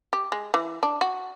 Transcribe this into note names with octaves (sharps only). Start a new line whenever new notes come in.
G4
G#3
E3
D4
F#4